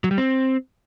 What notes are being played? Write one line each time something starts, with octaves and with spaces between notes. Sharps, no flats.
F#3
G3
C4